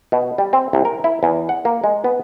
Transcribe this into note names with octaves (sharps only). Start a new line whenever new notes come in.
B2
G3
C4
C2
A#4
E4
E2
F#5
A#3
G#3
B3